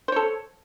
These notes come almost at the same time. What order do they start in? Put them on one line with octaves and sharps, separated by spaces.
C5 C#5 A4